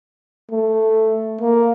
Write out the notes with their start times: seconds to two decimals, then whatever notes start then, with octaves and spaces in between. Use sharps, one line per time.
0.51 A3
1.41 A#3